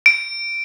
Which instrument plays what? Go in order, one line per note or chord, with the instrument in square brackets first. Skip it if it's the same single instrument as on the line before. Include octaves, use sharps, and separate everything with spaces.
[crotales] D7